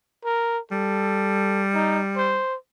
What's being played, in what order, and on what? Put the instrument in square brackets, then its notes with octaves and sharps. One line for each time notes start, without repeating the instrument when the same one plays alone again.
[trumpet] A#4
[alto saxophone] G3 [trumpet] A4
[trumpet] D#4
C5